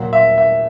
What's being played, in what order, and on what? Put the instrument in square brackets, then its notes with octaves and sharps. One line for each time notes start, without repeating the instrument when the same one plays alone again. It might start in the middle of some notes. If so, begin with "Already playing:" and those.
Already playing: [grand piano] A#2 F#3
E5
E5